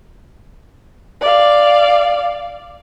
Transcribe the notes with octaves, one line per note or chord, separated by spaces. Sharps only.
D5 F5